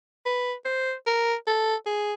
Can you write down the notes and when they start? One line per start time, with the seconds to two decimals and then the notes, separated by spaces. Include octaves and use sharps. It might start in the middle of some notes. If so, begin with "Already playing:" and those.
0.26 B4
0.66 C5
1.07 A#4
1.47 A4
1.87 G#4